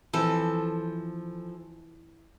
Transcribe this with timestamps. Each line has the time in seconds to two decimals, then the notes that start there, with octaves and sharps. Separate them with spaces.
0.13 E3 F3 C4 A4